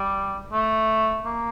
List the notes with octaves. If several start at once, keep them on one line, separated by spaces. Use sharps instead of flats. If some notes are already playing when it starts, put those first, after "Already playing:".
Already playing: G3
A3
A#3